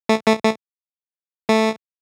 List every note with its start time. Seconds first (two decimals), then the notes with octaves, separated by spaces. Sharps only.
0.09 A3
0.27 A3
0.44 A3
1.49 A3